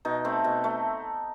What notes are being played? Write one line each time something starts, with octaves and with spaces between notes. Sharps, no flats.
B2 D#4
A3 C4
B2
A3